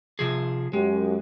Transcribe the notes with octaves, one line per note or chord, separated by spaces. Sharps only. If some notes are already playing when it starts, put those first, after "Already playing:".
C3 F3 G#4
F#2 G#3 G4